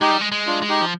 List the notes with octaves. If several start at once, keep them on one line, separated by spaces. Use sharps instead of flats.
G#3 D#4 G4
G3
G#3
G#3
D4 F4
G#3
D#4 G4
F3